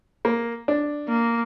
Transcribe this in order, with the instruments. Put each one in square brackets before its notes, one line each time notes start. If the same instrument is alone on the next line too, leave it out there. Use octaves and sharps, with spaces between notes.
[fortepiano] A#3
D4
[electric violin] A#3